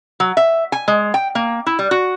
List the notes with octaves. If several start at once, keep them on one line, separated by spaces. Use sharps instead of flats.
F#3
E5
G#5
G#3
G5
A#3
E4
G3
F#4